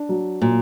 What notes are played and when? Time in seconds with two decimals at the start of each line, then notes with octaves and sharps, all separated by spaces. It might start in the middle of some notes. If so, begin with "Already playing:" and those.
Already playing: D4
0.09 F#3
0.41 A#2 F#3